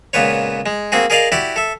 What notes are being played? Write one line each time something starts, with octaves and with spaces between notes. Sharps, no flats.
C#2 A#2 B3 B4 C#5
G#3
A#3 C4 F#4 G#4
G#4 A#4 D5 D#5 F5
E4 F#4 G4 D5
A4 E5